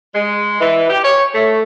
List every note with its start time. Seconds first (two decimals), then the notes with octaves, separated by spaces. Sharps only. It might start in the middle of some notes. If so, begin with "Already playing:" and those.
0.15 G#3
0.61 E3
0.89 G4
1.04 C#5
1.35 A3